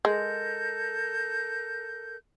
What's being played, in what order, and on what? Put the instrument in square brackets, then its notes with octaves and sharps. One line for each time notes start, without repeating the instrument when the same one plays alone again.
[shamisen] G#3 [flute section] A4 A#4 G6